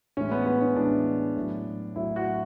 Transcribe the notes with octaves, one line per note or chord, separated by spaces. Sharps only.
A2 E3 G#3 C#4
B3
B3
C#4
A2 E3 G#3 D4
A2 F#3
A2 F#3 E4
F#4